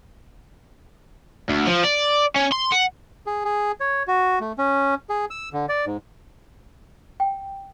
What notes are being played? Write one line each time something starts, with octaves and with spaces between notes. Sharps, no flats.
D2
F3
D5
C#4
C6
F#5
G#4
G#4
C#5
F#4
A3
C#4
G#4
E6
D3
D5
G#2
G5